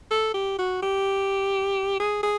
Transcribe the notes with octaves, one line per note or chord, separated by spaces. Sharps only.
A4
G4
F#4
G4
G#4
G#4